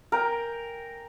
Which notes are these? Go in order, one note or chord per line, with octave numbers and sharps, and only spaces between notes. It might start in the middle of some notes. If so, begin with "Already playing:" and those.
A#4 G5 G#5